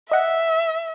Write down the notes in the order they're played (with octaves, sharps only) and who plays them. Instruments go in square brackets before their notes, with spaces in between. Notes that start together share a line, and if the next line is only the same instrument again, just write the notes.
[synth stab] D#5 F#5 [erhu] E5